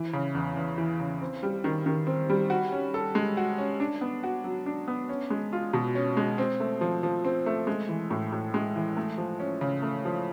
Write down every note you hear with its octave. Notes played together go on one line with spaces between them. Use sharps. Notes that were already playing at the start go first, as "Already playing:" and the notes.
Already playing: E3
C#3
E2
E2
E3
C#3
C4
G3
D#3
D#3
C4
G3
F#4
C#4
A4
G#3
F#4
C#4
D4
B3
F#4
F#3
D4
B3
C#4
G#3
F4
B2
C#4
G#3
C4
A3
F3
F3
C4
A3
G#3
E3
A2
A2
G#3
E3
A3
F3
C#4
C#3
A3
F3